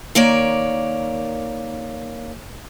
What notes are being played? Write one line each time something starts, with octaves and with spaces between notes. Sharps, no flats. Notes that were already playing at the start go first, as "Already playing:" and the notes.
D#3 A#3 C#5 D5